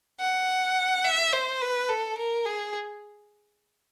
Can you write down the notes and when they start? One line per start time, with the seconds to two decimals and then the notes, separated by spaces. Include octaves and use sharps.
0.20 F#5
1.04 E5
1.33 C5
1.61 B4
1.89 A4
2.18 A#4
2.45 G#4